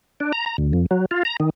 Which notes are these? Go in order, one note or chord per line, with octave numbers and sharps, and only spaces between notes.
D4
A#5
A#5
D2
F2
F#3
F4
A#5
D#3